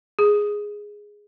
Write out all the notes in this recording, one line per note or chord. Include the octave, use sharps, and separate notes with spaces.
G#4